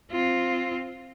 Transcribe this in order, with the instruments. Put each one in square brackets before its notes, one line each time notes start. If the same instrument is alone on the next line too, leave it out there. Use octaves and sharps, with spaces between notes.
[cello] C4 F4